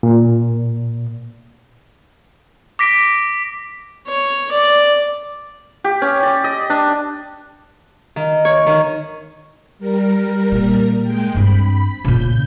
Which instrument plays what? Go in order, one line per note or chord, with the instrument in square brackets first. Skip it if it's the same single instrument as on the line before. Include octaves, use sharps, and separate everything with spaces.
[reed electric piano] A#2
[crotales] D6 A#6 B6 D7
[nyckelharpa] C#5
D5
[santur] G4
C#4
D5
D#5
D4
[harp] D#3
C#5
D#3
[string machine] G3 A#4
[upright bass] A#2
[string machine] G#3 G5
[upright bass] G2 C4 [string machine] B5
[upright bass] A#2 C#3 [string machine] G6